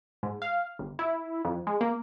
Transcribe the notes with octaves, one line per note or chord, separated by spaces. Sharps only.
G#2
F5
G1
E4
F2
G#3
A#3